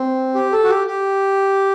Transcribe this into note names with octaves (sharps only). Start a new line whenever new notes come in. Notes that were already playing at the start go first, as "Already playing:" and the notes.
Already playing: C4
G4
A4
F#4
G4
G4